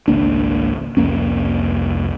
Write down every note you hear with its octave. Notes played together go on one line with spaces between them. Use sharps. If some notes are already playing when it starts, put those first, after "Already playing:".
G#1 C#2 A#3 D4
C2 F2 A#3 C#4